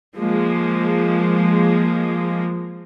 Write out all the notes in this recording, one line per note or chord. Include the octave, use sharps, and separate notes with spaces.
F3 G#3 A#3